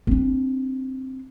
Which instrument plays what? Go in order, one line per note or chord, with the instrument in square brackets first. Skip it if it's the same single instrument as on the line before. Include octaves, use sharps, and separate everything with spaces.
[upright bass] C4 D4